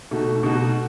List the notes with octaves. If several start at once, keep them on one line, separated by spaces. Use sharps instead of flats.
B2 A3 D#4 F#4
B2 A3 D#4 F#4